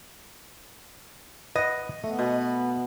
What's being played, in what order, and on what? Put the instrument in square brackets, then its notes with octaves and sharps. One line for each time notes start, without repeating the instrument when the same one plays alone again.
[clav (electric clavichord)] B4 F#5 [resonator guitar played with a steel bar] D#5
[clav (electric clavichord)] A3 [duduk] B3
[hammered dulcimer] B2